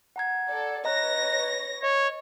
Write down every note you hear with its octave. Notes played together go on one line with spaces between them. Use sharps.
F#5 A#5 G#6
A4 D5
B4 C#5 D#5 A#5 F#6 A#6
C#5 D#5